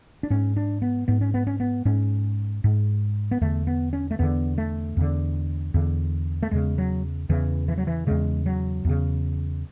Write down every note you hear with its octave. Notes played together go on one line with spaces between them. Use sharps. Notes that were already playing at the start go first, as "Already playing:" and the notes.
D4
G#2 C#4
D4
B3
G#2 B3
C#4
B3
C#4
B3
G#2 C#4
G#2
B3
E2 D3 A3
B3
C#4
A3
E2 D3 B3
A3
E2 D3
E2 D3
A3
E2 C#3 G#3
F#3
E2 C#3 E3
E3
F#3
E3
E2 C#3 G#3
F#3
E2 C#3